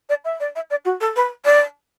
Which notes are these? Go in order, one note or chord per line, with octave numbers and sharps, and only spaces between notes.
D5
E5
D5
E5
D5
F#4
A4
B4
D5